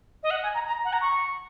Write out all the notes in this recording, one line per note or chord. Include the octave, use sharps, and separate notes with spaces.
D#5
F#5
G#5
A#5
A#5
F#5
A#5
C#6